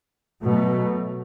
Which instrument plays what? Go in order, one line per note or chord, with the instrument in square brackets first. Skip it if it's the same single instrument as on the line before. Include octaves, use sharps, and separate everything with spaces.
[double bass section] B2 F#3 A3